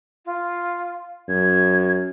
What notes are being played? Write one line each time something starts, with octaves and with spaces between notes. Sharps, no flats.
F4
F#2 G#6